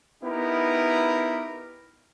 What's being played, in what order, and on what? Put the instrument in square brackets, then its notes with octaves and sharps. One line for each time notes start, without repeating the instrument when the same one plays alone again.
[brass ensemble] B3 D#4 E4 G4 A#4